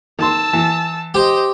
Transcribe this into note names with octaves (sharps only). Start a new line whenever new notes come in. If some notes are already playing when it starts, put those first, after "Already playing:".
D#3 A5 C6 E6
E3
G4 C5 D#5